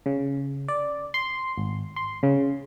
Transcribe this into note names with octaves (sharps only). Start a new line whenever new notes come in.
C#3
D5
C6
G#1
C6
C#3